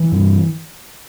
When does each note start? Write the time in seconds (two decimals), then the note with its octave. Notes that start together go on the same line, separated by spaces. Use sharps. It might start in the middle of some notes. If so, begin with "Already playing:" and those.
Already playing: E3
0.12 G2